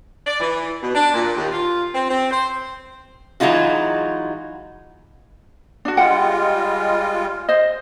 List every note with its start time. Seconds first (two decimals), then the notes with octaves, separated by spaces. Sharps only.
0.27 D5
0.40 E3
0.82 B2
0.95 D4
1.13 A#2
1.36 D#2
1.51 F4
1.93 C4
2.09 C4
2.30 C5
3.40 E3 F#3 G#3 D#4 F4 F#4
5.85 D4 F#4
5.97 G3 G#3 F4 F#5 G5
7.49 C5 D#5